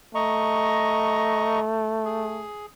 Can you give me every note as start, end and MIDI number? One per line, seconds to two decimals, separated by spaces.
0.15 2.48 57
0.15 1.60 75
0.15 1.60 82
0.15 1.60 85
2.05 2.66 68